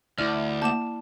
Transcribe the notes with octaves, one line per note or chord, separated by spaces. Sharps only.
D2 E4 D5 F6
A#3 A5 D6 E7